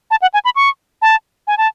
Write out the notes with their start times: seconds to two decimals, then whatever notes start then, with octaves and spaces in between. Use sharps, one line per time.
0.11 A5
0.22 F#5
0.34 G#5
0.45 B5
0.56 C#6
1.02 A5
1.47 G#5
1.58 A5